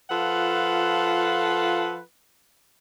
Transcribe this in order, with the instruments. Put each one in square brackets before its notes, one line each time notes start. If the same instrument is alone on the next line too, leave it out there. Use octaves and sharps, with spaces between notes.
[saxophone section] F3 F4 A4 B4 F#5